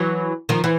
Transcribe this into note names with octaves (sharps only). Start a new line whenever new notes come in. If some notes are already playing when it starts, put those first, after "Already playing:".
Already playing: E3 F#3
D#3 F3
E3